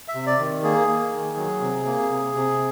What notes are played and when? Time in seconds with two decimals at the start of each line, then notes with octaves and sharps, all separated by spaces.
0.08 E5
0.15 C3
0.27 D5
0.39 D#3
0.63 A#3 G#4
0.88 A#3
1.12 D#3
1.37 F#3
1.61 C3
1.86 A#3
2.10 C3
2.35 C3